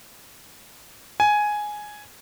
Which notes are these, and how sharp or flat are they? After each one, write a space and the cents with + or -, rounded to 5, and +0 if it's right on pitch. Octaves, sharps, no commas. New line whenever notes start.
G#5 +5